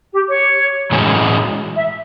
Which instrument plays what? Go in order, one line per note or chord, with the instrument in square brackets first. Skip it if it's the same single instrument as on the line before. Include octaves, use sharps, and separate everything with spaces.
[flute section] G4
C#5
[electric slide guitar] A2 E3 G#3 C#4 F#4
[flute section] E5